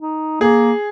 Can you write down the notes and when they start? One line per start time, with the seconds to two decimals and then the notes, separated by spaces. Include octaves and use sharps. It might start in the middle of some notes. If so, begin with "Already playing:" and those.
0.01 D#4
0.41 A#3 G#4